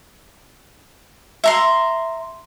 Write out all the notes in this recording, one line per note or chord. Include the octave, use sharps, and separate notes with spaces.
E5 A#5 C6